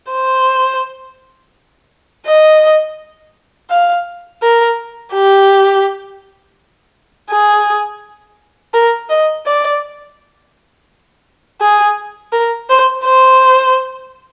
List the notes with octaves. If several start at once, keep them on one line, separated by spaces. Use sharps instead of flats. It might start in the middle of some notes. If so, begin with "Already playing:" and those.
C5
D#5
F5
A#4
G4
G#4
A#4
D#5
D5
G#4
A#4
C5
C5